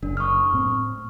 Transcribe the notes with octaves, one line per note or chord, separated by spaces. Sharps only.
F#1 D4
C#6 D#6 F6
A2 C4